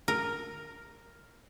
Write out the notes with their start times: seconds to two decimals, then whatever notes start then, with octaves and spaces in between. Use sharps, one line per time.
0.08 A#4